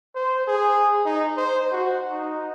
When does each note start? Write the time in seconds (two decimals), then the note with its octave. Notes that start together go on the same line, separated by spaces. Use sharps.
0.15 C5
0.47 G#4
1.05 D#4
1.37 C5
1.72 F#4
2.11 D#4